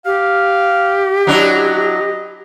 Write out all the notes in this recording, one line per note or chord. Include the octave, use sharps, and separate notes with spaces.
G4 F5
F#3 D4 E4 D#5